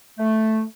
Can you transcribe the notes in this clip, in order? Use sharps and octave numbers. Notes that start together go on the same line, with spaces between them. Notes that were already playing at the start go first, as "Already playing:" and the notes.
A3